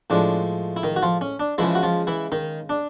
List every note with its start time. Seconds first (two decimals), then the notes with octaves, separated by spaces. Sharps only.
0.10 A2 F3 G#3 D4
0.77 E4
0.83 D#3 D#4
0.96 F#4
1.02 F3 F4
1.21 C#4
1.40 D4
1.58 C#3 E3 F3 G#3 E4
1.75 F#4
1.83 F3 F4
2.07 E3 E4
2.32 D#3 D#4
2.69 D4